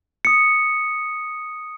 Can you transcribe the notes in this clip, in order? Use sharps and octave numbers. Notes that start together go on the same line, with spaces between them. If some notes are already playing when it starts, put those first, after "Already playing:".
D#6 C#7